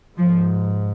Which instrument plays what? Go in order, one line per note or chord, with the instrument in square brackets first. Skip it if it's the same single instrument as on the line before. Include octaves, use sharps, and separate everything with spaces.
[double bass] G#2 [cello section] F3